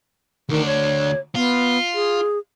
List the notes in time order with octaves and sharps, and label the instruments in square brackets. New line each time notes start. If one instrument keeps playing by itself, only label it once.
[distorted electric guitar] D2 D4 [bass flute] D#3
[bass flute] C#5
[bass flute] B3 [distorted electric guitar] F4
[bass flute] G#4